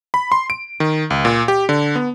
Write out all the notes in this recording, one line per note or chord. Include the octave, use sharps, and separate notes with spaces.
B5
C6
D7
D#3
C#2
A#2
G4
D3
B3